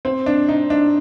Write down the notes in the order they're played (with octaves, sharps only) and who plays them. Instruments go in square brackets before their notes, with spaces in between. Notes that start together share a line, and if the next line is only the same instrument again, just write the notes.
[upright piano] C4
D4
D#4
D4